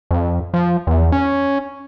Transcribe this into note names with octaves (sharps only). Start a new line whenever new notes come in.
F2
F3
E2
C#4